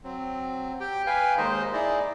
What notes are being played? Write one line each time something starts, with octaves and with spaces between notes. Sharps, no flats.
F#3 C4
G4 G5
B4 F5 G5 G#5
D#2 D#3 G#3 D#4 C5 D#5
D#4 E4 G#4 D5 D#5